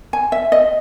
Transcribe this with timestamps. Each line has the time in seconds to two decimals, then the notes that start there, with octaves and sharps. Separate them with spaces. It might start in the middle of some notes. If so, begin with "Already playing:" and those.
0.13 G#5
0.32 E5
0.52 D#5